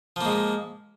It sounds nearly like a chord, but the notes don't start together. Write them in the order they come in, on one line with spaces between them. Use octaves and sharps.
F3 A#3 G#3